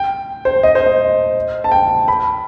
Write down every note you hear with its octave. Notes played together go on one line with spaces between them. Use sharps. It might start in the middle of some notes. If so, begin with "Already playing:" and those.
Already playing: G5
C5
D#5
C5
D#5
A5
G5
B5